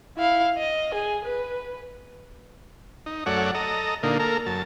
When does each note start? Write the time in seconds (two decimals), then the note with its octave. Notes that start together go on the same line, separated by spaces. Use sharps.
0.17 E4 F5
0.58 D#5
0.94 G#4
1.25 B4
3.06 D#4
3.26 F#2 A3 C#5 D5 F#5
3.54 A4 D#5 A#5
4.03 A#2 D3 A#3 D#4
4.20 A#3 A4 A#4
4.46 F#2 A5